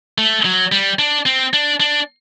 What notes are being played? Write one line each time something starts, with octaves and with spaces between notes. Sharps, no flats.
A3
F#3
G3
D4
C4
D4
D4